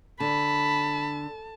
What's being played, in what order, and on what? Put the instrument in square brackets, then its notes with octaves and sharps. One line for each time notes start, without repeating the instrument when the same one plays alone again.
[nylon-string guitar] D3 [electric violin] A5 [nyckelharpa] B5